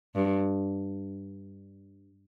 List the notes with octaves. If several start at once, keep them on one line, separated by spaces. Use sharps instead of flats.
G2